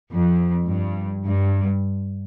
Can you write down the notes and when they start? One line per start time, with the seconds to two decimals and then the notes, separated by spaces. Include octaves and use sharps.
0.12 F2
0.68 G2
1.25 G2